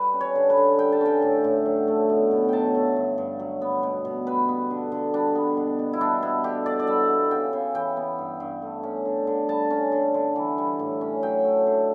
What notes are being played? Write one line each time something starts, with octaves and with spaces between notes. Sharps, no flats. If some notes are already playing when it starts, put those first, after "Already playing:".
Already playing: G3 B4
C#4
C#5
D3
B4
D3
G3 G5
A5
C#4 G5
A2
A2
F#3
A3
B2
B2
F#3 G5 A5
A3
G2
G2
F#3
B3
B2
B2
G3 B4
B3
D3
D3
G3 D4
B3
B2
B2
E4
G3 D4
B3 E4
D3 G4
D3 D5
D5
G3 E5
B3
C#3 G5
C#3
E3 G5
B3
G2
G2
A3
C#4
D3
D3
G3 A5
C#4
D3
D3
E3
G3
A2
C#4
F#3 G5
A3
D3